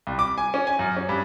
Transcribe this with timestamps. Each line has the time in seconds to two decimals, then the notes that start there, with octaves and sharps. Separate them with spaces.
0.07 C2
0.19 D6
0.38 G#5
0.54 C#4
0.67 G#5
0.79 F#2
0.97 C#4
1.09 G2